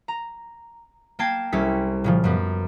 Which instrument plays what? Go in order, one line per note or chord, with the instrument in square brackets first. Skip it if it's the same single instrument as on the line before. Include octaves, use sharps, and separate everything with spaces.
[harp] A#5
A#3 G5 A5 G#6 C7
C2 C#4 A4 B6
A#2 C#3 F3
F#2 B3